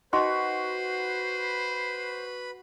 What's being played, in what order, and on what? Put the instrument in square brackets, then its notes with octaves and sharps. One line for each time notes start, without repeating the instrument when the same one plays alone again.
[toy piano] D#4 D#5 C6 [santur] F#4 [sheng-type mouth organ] B4 B5 [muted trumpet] C5